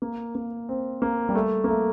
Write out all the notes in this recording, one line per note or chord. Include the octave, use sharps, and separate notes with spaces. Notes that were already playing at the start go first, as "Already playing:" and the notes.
A#3
A#3
C4
A#3
G3
A3
A#3
A3